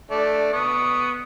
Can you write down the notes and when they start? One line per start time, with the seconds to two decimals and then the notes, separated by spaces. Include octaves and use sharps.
0.11 A3 D4 D5
0.53 B3 C#6 D#6